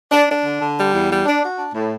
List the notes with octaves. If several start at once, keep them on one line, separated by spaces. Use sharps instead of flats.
D4
D4
D3
D3
G3
E2
G3
D4
F#4
D4
A2